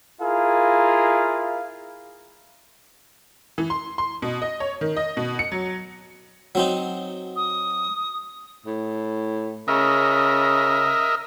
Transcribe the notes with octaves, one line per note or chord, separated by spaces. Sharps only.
E4 F4 G#4 A#4 F5
E3
C6
C6
B2
D#5
C#5
D#3
D#5
B2
C#7
F#3
F#3 C4 D#4
D#6
A2
C#3 A#4 D#5 E5